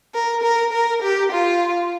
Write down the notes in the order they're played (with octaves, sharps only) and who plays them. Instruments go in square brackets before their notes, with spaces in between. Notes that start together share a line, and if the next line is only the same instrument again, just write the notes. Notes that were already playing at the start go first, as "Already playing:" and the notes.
[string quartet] A#4
A#4
A#4
G4
F4